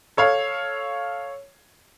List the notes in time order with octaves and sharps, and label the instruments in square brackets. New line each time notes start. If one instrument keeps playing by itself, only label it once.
[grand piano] A4 C#5 F5